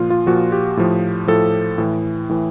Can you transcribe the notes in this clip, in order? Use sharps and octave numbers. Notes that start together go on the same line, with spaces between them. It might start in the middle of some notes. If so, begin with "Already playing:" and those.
Already playing: A#2 F3 F4
F4
A#2 F3 F#4
G4
A2 F3
A2 F3 A4
A2 E3
A2 E3